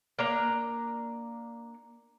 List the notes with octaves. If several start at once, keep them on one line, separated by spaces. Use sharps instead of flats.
A#3 D4 A#5